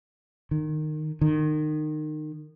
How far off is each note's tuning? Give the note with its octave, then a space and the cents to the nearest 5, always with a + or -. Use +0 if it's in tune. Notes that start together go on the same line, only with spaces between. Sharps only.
D#3 -20
D#3 -25